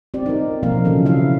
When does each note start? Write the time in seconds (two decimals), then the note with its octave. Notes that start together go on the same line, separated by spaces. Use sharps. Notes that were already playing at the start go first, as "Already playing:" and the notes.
0.14 C4 G4 D5
0.26 D#4 A#4
0.63 B2 F3 A#3 A#4 F5
0.85 C#3 E3 F#3 C#4 A4
1.05 F3 E4 E5 F5